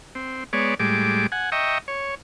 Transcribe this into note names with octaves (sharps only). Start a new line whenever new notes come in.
C4
G#3 B3 C#5 D5
A2 G3 G#3 D6
F#5 G#5
D#5 E5 G5 A#5 C#6
C#5